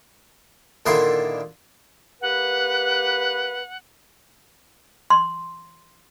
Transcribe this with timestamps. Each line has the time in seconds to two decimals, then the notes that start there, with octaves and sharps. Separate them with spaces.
0.86 A#2 D3 D#3 E4 C6
2.21 A#3 G4 B4 F#5
5.10 C6